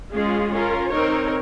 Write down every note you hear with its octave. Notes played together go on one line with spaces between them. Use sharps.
G#3 C#4 F4 G#4
C#4 F4 A#4
C4 D#4 A#4 C#5